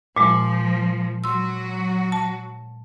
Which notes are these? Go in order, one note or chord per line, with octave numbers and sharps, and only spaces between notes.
A#2 F3 G#3
F#3 F#4 C6 E6
A5